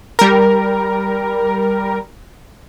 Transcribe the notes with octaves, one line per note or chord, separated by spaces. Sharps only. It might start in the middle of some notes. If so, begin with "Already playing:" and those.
G3 A#4